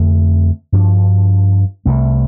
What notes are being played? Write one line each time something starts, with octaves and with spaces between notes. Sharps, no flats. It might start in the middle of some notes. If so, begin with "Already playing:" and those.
Already playing: F2 D3 A3 C4
G2 F3 D4
C2 C3 A3